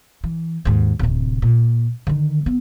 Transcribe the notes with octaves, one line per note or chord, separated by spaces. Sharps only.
E3
D#2 G#2
D1 C3
A#2
D3 D#3
B3 C4